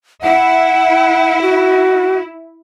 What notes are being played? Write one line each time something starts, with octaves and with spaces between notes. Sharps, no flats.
E4 F#5
F#4